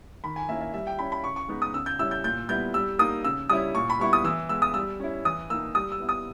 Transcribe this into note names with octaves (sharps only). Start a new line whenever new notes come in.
D#3 B5
G#5
A#3 C#4 E4 E5
E5
G3 E5
G5
C#4 E4 B5
B5
C#3 C#6
C#6
G#3 B3 D#4
D#6
C#3 E6
G6
G3 C#4 E4 E6
G6
A#2 G6
G3 B3 E4 G6
G3 E6
A#3 D#4 D#6
C#3 E6
G3 C#4 E4 D#6
A#2 C#6
B5
G3 B3 E4 C#6
D#6
E3 E6
G#3 B3 E6
D#6
G3 E6
C#4 E4
E3 D#6
A#3 D#4 E6
G3 D#6
E6
B3 E4
D#6